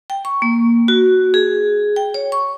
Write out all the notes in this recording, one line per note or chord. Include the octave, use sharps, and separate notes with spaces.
G5
C#6
A#3
F#4
G#4
G5
C#5
C#6